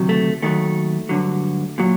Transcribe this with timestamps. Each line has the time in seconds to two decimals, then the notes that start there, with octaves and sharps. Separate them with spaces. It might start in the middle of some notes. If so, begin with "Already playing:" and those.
Already playing: D2 C3 D#3 F#3
0.09 A3
0.43 D#2 D#3 F#3 A3
1.09 G2 D3 F#3
1.78 A#2 F#3